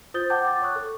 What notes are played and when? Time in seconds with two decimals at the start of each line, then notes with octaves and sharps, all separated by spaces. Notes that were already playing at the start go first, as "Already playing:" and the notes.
0.14 F4 C5 D#6 G6 A6 G7
0.30 F#5 G5 A5 D6 G6
0.45 D6 A6
0.62 C#5 C#6 D#6 F#6
0.76 A4